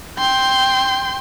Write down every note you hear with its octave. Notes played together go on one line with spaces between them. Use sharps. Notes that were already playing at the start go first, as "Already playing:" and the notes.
G5 C6